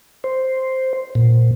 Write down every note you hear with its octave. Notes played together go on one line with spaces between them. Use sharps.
C5
A#2